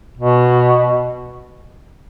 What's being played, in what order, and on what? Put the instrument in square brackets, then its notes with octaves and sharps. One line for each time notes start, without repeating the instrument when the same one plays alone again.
[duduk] B2